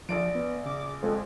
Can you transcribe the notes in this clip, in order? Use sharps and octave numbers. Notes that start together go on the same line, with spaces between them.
A#1 F3 D5 D7
B3
C#3 D6
F2 G#3